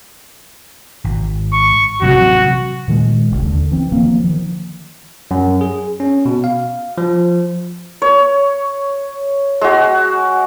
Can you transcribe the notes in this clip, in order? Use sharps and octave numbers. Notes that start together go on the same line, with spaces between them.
G#1
C#6
A1 C3 F#3 F#4
A#2 D#3 F3 G#3
D#1 G#1 C#2 C#3
D#2 D3
E3 C4
D#3 F3 F#3 A#3
D#3 F3
F#2
G#4
C#4
B2
F5
F3
C#5
G#3 F#4